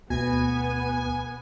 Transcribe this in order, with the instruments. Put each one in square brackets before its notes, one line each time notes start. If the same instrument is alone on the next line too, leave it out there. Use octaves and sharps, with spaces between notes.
[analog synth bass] D2 [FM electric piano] B2 [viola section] B3 [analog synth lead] G#5